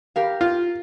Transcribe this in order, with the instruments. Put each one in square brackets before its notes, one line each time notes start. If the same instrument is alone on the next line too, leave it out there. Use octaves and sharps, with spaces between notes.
[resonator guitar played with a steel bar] G4 A#4 F5
[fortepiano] F4